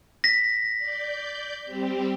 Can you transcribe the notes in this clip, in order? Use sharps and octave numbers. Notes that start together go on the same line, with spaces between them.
A#6 B6
D5 G6
G3 C4 G4